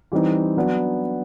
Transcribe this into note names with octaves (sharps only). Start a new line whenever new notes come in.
E3 G3 C4 D#4
F#3 B3 D4